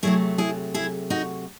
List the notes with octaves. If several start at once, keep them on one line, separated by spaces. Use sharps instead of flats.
C3 F#3 A3 E4 G#4
E4 G#4
E4 G#4
D#4 F#4